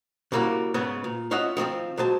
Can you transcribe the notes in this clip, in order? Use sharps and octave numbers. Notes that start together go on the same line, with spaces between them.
C#3 G3 A#3 E4 F#4
G#2 C#3 B3 B4
A#2
C#4 F4 C#5 D#5 E5 F#5
D#3 F3 C4 F4
F#3 G#3 C5 A5